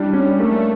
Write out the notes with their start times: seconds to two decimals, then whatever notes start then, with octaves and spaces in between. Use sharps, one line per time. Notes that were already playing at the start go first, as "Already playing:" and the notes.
Already playing: G3 D4 E4
0.13 C#4
0.39 A3 A#3